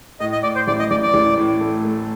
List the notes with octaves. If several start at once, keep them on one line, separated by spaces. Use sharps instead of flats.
A2 D#5
D#5
A2 D5
C5
A1 D5
D#5
A1 D5
D5
A1
A2
A3
A3